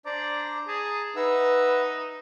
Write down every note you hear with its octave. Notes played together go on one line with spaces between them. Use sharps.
D4 C5 D5 A#5
G#4 A5 A#5
D#4 B4 E5 F#5 E6